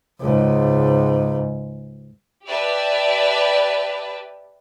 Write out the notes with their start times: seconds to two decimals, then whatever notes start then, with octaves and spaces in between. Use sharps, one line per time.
0.20 C#2 G#2
2.46 G4 B4 D5 E5 A5